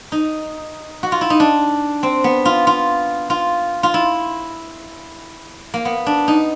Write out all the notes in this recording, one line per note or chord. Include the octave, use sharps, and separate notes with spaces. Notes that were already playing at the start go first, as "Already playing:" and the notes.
D#4
F#4
F4
E4
D#4
D4
C4
B3
F4
F4
F4
F4
E4
A#3
B3
D4
D#4